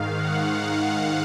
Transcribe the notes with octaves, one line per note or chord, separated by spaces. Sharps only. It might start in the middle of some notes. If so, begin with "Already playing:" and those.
Already playing: G#2 D#3 F5
F#5